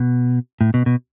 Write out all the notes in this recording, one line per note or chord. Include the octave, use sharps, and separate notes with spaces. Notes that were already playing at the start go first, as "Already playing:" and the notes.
Already playing: B2
A2
B2
B2